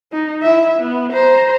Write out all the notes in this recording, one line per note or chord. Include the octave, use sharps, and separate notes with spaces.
D#4
E4 E5
B3
C5 A#5